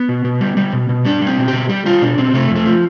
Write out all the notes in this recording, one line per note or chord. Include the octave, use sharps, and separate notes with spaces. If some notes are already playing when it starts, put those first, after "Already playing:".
Already playing: B3
B2
B2
G3
G3
B2
B2
G3 D4
G3
C4
B2
G4
B2
G3 G4
G3 F4
B2 D4
B2 C4
C3 A3
F2
A3
F3